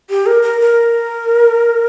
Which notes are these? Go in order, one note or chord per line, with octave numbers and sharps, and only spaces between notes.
G4
A#4
A#4
A#4